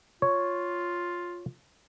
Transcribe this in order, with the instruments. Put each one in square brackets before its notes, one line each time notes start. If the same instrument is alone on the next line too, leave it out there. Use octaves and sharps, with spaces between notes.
[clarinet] F4 [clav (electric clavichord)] C#5